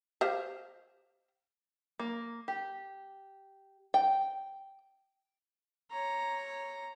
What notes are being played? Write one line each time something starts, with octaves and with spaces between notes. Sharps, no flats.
G4 C5 F5
A#3
G4
G5
C#5 A#5